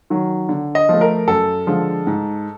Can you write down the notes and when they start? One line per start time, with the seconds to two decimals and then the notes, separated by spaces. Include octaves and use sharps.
0.10 D#3 F#3
0.49 D3
0.75 D#5
0.89 F3 A3
1.01 A#4
1.27 F#2 A4
1.67 D3 F3 G#3
2.07 G#2